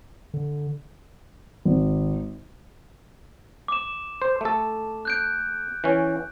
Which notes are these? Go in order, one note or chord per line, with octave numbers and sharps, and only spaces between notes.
D3
G#1
D6 E7
C5
A3 A4
F#6 G6 D7
E3 C#4